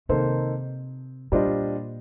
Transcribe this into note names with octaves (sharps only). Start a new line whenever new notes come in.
C3 D#3 A#3 D#4 A4 C5
A#2 G3 D4 F4 C5 D#5